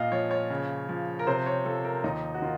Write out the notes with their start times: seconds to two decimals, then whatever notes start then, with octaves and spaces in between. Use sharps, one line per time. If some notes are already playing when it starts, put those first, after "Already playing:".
Already playing: A#2 D#5 F5
0.12 F3 C#5
0.31 C#5
0.50 C#3
0.89 F3
1.19 A#4
1.27 C3 C5
1.46 C#5
1.65 F3 A4
1.84 A#4
2.04 D#2 D#4
2.34 F#4
2.42 D#3 F4